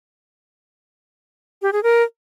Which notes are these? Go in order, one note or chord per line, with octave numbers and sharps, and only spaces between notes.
G4
G#4
A#4